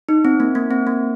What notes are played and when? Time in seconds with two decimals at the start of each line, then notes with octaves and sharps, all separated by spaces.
0.09 D#4
0.25 C4
0.40 A#3
0.55 A#3
0.71 C4
0.87 A#3